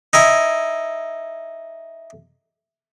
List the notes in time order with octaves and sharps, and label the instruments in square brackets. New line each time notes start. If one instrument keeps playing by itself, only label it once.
[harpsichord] D#4 E4 G#5